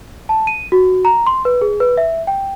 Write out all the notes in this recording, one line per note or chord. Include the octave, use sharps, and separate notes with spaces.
A5
D#7
F#4
A#5
C6
B4
G#4
B4
E5
G5